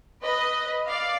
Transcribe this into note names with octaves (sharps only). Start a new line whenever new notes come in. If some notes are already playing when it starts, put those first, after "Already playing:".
B4 D#5
D5 F5